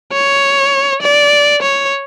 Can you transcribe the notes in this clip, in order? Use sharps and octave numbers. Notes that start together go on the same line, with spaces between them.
C#5
D5
C#5